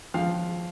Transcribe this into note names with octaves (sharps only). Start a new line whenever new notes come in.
F3 F5